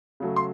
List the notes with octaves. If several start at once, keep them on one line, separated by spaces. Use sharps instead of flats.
C#3 F#3 A3
C6